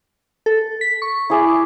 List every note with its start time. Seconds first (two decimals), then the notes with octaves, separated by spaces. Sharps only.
0.46 A4
0.81 B6
1.02 C#6
1.30 E4 G#4 D5